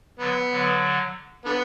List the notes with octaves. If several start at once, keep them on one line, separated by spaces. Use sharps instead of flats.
D3 F#3 B3
D3 F#3
D3 B3